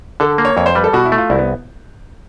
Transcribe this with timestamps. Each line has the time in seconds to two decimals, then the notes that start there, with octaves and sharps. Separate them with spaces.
0.20 D3 A4
0.38 A#3
0.45 C#5
0.57 F2 C#5
0.66 C5
0.75 G3 B4
0.84 A4
0.93 B2 F#4
1.06 E4
1.12 A3
1.18 F4
1.30 C2 E4
1.39 B3